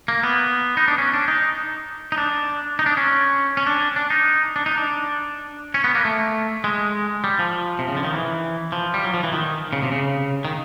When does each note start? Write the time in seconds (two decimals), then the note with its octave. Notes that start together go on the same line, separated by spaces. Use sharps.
0.08 A#3
0.23 B3
0.77 D#4
0.88 D4
0.98 C#4
1.13 D4
1.28 D#4
2.12 D#4
2.17 D4
2.79 D#4
2.86 D4
2.97 C#4
3.57 C#4
3.67 D4
3.96 D4
4.10 D#4
4.56 D4
4.66 D#4
4.78 D4
5.74 C#4
5.84 B3
5.95 A#3
6.05 A3
6.64 G#3
7.24 G3
7.39 F3
7.79 C3
7.88 C#3
7.97 D3
8.04 D#3
8.14 E3
8.72 F3
8.94 G3
9.04 F#3
9.14 F3
9.23 E3
9.33 D#3
9.73 C#3
9.83 C3
9.92 C#3
10.45 D#3